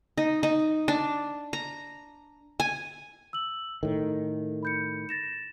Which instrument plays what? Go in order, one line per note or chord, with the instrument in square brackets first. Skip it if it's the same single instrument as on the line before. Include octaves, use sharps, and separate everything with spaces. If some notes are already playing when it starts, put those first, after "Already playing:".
[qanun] D#4
D#4
D4
A#5
G#5
[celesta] E6 F#7
[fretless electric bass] A2 D#3 [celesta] A4
[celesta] B5 G6 C#7
A6 A#6 E7